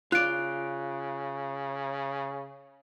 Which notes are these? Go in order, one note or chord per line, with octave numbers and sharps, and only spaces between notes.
C#3 F4 D5 F#6 D7